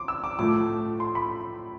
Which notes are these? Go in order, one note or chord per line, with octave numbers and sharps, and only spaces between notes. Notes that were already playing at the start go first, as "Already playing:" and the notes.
Already playing: C6 D6
E6
D6
A2 F3 A3 D6
C6
B5